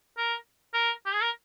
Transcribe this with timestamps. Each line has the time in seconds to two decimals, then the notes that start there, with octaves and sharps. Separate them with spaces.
0.18 A#4
0.74 A#4
1.06 G4
1.13 G#4
1.22 A#4